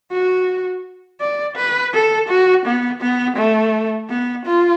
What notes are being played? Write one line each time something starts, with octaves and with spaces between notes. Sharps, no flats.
F#4
D5
B4
A4
F#4
B3
B3
A3
B3
F4